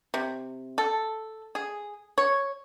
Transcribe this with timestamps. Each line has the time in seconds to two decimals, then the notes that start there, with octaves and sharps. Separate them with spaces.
0.14 C3
0.78 A4
1.55 G#4
2.18 C#5